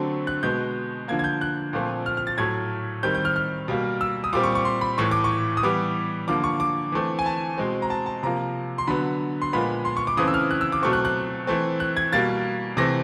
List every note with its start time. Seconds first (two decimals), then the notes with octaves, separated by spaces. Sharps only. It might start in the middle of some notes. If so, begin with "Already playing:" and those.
Already playing: D3 F#3 A3 C4
0.27 F#6
0.43 B2 G#3 B3 G6
1.08 D3 F3 A#3 G#6
1.19 G#6
1.24 G6
1.41 F#6
1.73 A#2 F3 A3 C4
2.06 F6
2.17 F6
2.27 A6
2.38 A2 F#3 A3 G#6
3.03 D#3 G3 C4 G6
3.15 G6
3.25 F6
3.36 F6
3.68 B2 G3 A#3
4.01 E6
4.24 D#6
4.33 A#2 G3 C4 D6
4.44 C#6
4.55 C#6
4.65 C6
4.81 B5
4.98 A2 E3 A3 C#6
5.11 D6
5.24 C#6
5.57 D#6
5.63 E3 G3 B3 D6
6.28 D3 F3 A#3 D6
6.44 C#6
6.60 D6
6.92 E3 A3 C4
7.19 G#5
7.26 A5
7.58 B2 G#3 C4
7.82 A#5
7.90 A5
8.06 A5
8.23 C3 F3 A#3 A#5
8.78 C6
8.87 D3 F#3 B3 B5
9.42 C6
9.53 A#2 F3 G#3 B3 B5
9.85 C6
9.97 C#6
10.07 D6
10.17 C#3 E3 A3 C4 D#6
10.28 E6
10.34 F6
10.51 F#6
10.61 E6
10.72 D6
10.83 B2 F#3 A3 C4 C#6
10.93 F#6
11.05 F#6
11.47 E3 A3 C4
11.80 F#6
11.97 G#6
12.13 B2 G3 A#3 A6
12.77 C3 E3 A3 C4 A#6